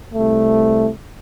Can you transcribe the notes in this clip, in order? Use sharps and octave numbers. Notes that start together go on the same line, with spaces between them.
C2 A3